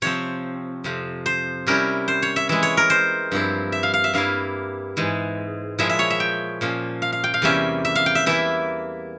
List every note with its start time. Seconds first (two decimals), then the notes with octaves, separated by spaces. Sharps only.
0.02 C3 F3 C4 C#5
0.84 F2 C3 F3
1.26 C5
1.67 C3 G3 C#4 E4 A#4
2.08 C5
2.22 C#5
2.36 E5
2.49 E3 G#3 E4 E5
2.63 C#5
2.77 A#4
2.90 C5
3.32 G2 F3 C4 E4
3.72 E5
3.83 F5
3.94 F5
4.04 E5
4.14 G2 G3 A#3 E4 F5
4.97 G#2 E3 G#3
5.79 A#2 F3 G#3 E4 E5
5.89 E5
5.99 C#5
6.10 E5
6.20 G5
6.61 A#2 F3 A#3 C#4
7.02 F5
7.12 F5
7.24 G5
7.34 F5
7.42 E2 C3 G3 A#3 C#4 E5
7.85 E5
7.96 F5
8.06 G5
8.15 E5
8.26 E3 A#3 E4 E5